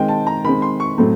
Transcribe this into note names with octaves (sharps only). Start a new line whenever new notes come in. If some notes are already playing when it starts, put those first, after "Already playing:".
Already playing: D#3 G#3 C4 G5
A5
A#5
D#3 G#3 C4 B5
C6
C#6
A2 F#3 A3 C4